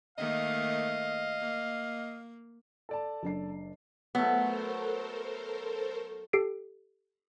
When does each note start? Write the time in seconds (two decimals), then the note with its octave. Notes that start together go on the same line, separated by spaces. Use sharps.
0.18 D#3 A3 A#3 D#5 F5
1.40 A#3
2.89 A4 D5 A5
3.23 F#1 D4 C7
4.15 F#3 A3 B3 A4 A#4 C5
6.33 G4 A4 C7 D7